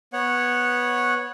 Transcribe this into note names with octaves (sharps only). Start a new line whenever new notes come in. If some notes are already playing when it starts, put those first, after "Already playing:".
B3 C#5 F#5